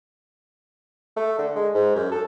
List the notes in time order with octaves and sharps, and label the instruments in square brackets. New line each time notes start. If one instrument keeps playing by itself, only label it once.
[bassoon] A3
D3
G#3
G#2
F#2
A4